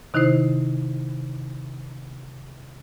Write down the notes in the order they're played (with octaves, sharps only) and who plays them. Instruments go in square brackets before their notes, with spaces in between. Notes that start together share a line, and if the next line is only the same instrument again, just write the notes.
[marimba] C3 D#3 D#4 E4 C5